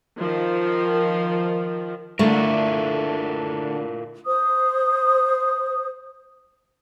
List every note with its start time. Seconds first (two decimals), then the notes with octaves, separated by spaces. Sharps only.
0.19 D#3 F3
2.19 D3 A3 D4 E4 F4 A#4
4.26 C5 D#6